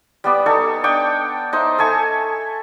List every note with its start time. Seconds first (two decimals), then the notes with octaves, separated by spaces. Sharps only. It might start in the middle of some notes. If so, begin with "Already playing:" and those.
0.24 G3 B3 D5
0.46 D#4 A4 G#5 C#6
0.84 D4 G5 C#6 D#6
1.53 D#4 C5 E5
1.78 A4 E5 G#5 C#6